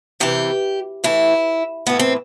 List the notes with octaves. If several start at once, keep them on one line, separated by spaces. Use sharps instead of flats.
C3 E3 G4
A2 E3 E4
A2 E3 B3
C4